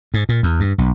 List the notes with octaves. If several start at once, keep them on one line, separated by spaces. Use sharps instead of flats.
G#2
A#2
E2
G2
B1